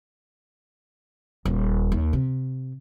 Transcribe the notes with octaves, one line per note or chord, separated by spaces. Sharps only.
D#1
D#2
C3